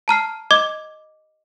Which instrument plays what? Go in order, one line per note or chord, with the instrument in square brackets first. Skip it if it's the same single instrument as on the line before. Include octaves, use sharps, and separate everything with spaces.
[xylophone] A5 A#5 F6 C7
D#5 D6 G#6